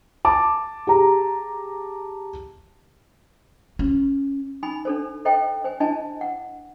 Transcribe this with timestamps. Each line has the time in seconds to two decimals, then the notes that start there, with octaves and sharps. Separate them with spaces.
0.25 A5 D6
0.87 G4 G#4 A#5
3.79 C#4
4.63 D#4 G#5 B5
4.85 D4 A4 C5
5.25 A4 C5 D#5 G5 A#5
5.64 C5 G#5
5.80 D4 E4 D#5 G#5 A5
6.21 F#5